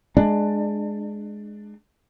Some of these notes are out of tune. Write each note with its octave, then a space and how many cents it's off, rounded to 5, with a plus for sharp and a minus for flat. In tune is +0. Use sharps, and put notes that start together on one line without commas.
G#3 +10 D4 +20